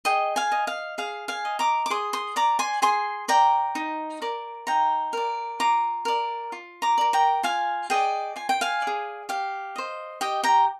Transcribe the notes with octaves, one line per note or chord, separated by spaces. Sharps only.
G#4 D#5 G5
F5 G#5
D#5
F5
G#4 F5
F5 G#5
D#5
A#5 D6
D6
G#4 C6 D#6
C6 D#6
D5 A#5 D6
G#5 C6
G#4 G#5 C6
D5 G5 A#5
D#4
A#4 D5
D#4 G5 A#5
A#4 D5
F4 A#5 D6
A#4 D5
F4
A#5 D6
A#4 D5
G5 A#5
F4 F5 G#5
G#4 D5 D#5 G5
F4 G#5
G5
F5 G#5
G#4 D5
G4 F5
C5 D#5
G4 D#5 G5
G5 A#5